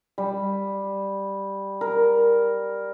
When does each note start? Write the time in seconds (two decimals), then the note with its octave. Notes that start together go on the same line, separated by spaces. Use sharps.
0.18 G3
1.81 A#4